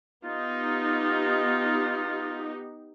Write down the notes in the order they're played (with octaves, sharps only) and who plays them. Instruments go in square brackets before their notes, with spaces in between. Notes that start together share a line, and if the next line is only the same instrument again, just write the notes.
[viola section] B3 D#4 G4 [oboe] F4